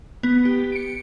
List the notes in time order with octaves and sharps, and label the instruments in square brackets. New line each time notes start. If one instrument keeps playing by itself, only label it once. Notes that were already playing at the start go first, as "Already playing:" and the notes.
[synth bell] B3
G4
C#7 D7